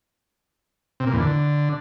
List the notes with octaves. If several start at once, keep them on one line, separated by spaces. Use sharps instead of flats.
C3
A#2
E2
D3